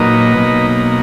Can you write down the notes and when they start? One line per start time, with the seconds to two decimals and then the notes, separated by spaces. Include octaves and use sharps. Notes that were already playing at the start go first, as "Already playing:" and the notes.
Already playing: A#2 F#3 A#3 D#4 B4 D#5
0.34 B2 F#3 A#3 D#4